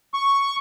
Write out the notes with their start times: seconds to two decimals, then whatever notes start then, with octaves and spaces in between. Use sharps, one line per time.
0.14 C#6